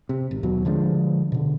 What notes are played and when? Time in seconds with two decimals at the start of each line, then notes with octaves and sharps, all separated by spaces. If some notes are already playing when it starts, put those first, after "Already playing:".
0.09 C3
0.31 G#1
0.43 D#2 B2 F#3
0.65 D3 F3 G#3 D4
1.32 B2 D3